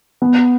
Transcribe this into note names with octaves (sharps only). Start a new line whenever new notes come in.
B3